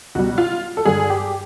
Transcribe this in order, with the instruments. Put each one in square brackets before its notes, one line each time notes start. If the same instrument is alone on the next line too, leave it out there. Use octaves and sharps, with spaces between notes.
[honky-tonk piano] C#2 B2 G3 F#4
F4
A4
G2 D3 G3 G#4
G4